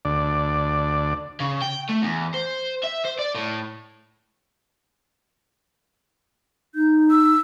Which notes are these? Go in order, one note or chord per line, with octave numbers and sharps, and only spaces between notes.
D2 D5
C#3
G5
A3
E2
C5
E5
C5
D5
A2
D#4 G6
E6